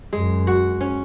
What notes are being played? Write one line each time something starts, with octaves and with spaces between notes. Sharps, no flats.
F#2 G#3
F#4
C#4